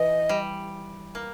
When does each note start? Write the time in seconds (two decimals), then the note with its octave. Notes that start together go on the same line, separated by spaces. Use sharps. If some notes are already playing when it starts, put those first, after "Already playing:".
Already playing: E3 D#5
0.29 G3
1.15 A#3